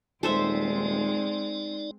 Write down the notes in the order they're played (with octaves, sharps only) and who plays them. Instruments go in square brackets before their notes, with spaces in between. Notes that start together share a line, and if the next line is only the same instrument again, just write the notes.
[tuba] D#1 [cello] G#3 C4 [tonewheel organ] D#4 D5 [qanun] A4 C5 E5